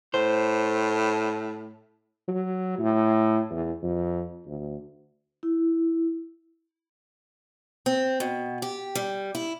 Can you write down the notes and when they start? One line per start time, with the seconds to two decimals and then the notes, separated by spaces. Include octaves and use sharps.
0.14 A2 C5
2.28 F#3
2.79 A2
3.50 E2
3.82 F2
4.46 D2
5.43 E4
7.86 C4
8.20 B2
8.62 G4
8.95 G3
9.35 E4